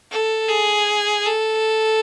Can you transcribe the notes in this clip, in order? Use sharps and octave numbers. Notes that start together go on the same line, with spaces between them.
A4
G#4
A4